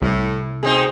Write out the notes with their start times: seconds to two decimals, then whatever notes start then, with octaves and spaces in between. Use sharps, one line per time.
0.02 C2 A2
0.63 D2 B2 G#3 C4 D#4 G#4 D#5